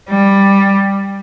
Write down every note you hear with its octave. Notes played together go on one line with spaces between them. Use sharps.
G3